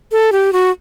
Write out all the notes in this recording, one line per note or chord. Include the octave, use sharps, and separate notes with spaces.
A4
G4
F#4